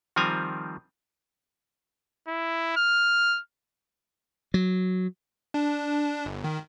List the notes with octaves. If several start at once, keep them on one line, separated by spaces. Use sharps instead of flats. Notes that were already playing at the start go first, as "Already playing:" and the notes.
D#3 F3 G3 C4 G#5 A#5
E4
F6
F#3
D4
G1
D#3